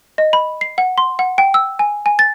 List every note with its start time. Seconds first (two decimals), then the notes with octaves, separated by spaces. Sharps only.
0.18 D#5
0.33 B5
0.61 C7
0.78 F#5
0.98 C6
1.19 F#5
1.38 G5
1.54 E6
1.79 G#5
2.06 G#5
2.19 A6